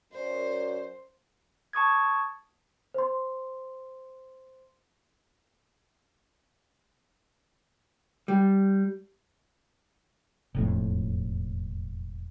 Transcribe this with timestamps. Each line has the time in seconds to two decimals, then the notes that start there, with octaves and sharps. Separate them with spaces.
0.13 F#2 C5 D5
1.73 A5 C#6 D#6 G#6
2.94 C5 C6
8.28 G3
10.55 E1 F2 A2